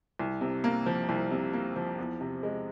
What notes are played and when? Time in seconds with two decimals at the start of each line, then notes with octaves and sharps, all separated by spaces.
0.19 C2
0.41 C3
0.64 A#3
0.86 F3
1.09 C2
1.31 C3
1.53 A#3
1.76 F3
1.98 E2
2.21 C3
2.43 G#3